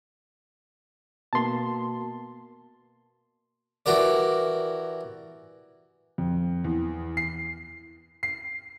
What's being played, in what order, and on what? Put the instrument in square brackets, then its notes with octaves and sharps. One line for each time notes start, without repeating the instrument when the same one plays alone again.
[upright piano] B2 A#3 G7 [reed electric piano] A5 C6
[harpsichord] E3 F#4 G4 A#4 D5
[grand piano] F2
E2
C7
C7